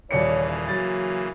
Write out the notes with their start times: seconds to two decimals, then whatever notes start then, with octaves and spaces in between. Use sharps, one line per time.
0.11 D#1 C#3 E3 A#3 C#5 D5 C#7
0.68 F#3 A6